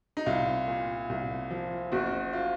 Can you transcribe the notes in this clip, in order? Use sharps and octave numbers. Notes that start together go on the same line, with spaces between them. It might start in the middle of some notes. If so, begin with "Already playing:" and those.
D#4
C2 F4
A#2
C2
F3
F#1 F#4
F4